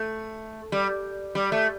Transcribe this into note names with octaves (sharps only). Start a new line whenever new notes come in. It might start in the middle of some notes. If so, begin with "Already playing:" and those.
Already playing: A3
G3
G3
A3